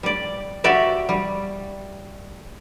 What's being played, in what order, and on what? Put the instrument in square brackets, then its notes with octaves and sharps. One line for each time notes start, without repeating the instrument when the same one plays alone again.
[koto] G3 D5
F#4 G4 D5 E5
G3